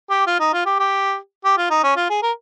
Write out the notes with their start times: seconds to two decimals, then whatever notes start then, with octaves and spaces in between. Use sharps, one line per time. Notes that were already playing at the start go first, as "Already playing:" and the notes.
0.10 G4
0.27 F4
0.40 D#4
0.53 F4
0.66 G4
0.79 G4
1.44 G4
1.57 F4
1.70 D#4
1.83 C#4
1.96 F4
2.10 G#4
2.22 A#4